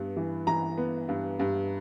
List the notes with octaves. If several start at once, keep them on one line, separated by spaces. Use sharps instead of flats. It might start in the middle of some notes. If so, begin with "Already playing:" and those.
Already playing: G2 B3
E3
E3 A#5
B3
G2
G2